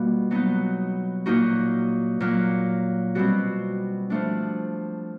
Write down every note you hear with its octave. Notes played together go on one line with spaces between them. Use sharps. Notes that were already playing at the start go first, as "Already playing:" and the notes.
Already playing: B2 G3 A#3 F4
F#3 B3 D#4
A#2 F#3 A#3 D#4 F#4
A#2 F#3 A#3
B2 G3 C4 F#4
F3 A3 D4